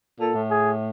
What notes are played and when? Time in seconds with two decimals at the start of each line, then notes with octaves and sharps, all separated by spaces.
0.20 A#2 A4
0.35 A2
0.50 G#4